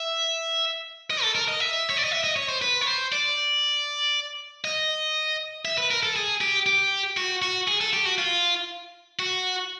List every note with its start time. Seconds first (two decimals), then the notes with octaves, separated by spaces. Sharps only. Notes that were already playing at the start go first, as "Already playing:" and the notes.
Already playing: E5
1.10 D#5
1.23 A4
1.35 A#4
1.48 D#5
1.60 E5
1.90 C#5
1.97 D5
2.04 D#5
2.11 E5
2.24 D#5
2.36 C#5
2.49 C5
2.62 B4
2.81 C#5
2.87 C5
3.12 D5
4.64 D#5
5.65 E5
5.78 B4
5.91 A#4
6.03 A4
6.16 G#4
6.41 G4
6.66 G4
7.17 F#4
7.42 F#4
7.68 G#4
7.81 A4
7.93 G4
8.05 F#4
8.18 F4
9.19 F#4